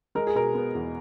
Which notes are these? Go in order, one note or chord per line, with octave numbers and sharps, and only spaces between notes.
G#3 A#4
G#4
B2 A#4
B3
E2